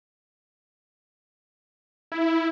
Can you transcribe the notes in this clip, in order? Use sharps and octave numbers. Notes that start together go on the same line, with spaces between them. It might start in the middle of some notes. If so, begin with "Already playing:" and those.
E4